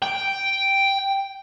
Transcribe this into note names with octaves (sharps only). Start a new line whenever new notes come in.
G5